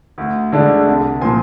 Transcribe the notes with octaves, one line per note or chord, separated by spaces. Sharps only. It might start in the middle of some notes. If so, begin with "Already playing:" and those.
D2
D3 G#3 D4
C2
A#2 F3 G#5 C6